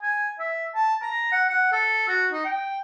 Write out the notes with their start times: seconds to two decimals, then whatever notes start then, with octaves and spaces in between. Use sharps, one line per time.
0.03 G#5
0.39 E5
0.75 A5
1.02 A#5
1.32 F#5
1.50 F#5
1.73 A4
2.08 F#4
2.33 D#4
2.45 G5